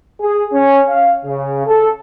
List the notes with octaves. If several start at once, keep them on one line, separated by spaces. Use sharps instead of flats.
G#4
C#4
F5
C#3
A4